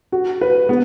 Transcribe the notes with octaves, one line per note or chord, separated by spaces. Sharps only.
F#4
B4
B3